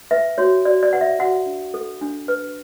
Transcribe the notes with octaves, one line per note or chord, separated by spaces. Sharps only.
B4 E5
F#4 C#5
F#4 D5
D5
B4 F#5
E5
F#4 F#5
D4
A4
D4
B4